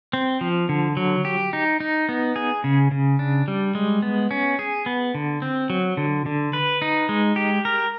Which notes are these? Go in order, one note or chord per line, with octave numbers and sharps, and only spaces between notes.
C4
F3
D3
F#3
G4
D#4
D#4
B3
G#4
C#3
C#3
D4
G3
G#3
B3
C#4
G#4
B3
D3
C4
F#3
D3
D3
B4
D#4
G#3
G4
A#4